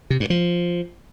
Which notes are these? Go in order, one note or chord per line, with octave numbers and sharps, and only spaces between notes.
C3
G2
F3